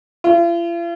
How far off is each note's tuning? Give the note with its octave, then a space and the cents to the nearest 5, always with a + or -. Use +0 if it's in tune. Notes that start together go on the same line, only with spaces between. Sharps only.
F4 -45